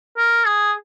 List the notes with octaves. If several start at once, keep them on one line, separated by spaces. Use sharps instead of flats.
A#4
G#4